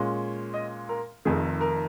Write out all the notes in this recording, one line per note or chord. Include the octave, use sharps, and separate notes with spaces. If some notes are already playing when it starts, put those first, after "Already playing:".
Already playing: A#2 G#3 C#4 F4
D#5
A#4
F1 F2 D#3 G#4
A#4